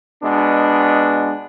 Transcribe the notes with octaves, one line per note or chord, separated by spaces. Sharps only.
B2 G#3 B3 D4